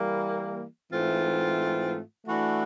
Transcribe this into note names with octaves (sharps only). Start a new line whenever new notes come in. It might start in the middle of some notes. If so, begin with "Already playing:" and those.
Already playing: E3 G3 A#3
G#2 E3 A3 C4 F4
E3 A3 D4 F#4